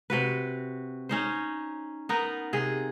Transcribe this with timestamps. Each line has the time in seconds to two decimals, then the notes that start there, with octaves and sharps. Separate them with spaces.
0.10 C3 F#4 B4
1.09 C#4 D#4 C5
2.09 B3 D#4 A#4
2.53 C3 G#4